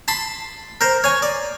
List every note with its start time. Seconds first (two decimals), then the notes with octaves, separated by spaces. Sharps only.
0.08 A5 B5 C6
0.81 A#4 C5
1.04 C#5 G#5
1.22 D5